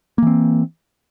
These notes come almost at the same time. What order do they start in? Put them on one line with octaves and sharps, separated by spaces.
A#3 E3 C4